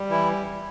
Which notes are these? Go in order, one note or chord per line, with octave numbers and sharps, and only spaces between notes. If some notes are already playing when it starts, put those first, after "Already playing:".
Already playing: G3
E3 E4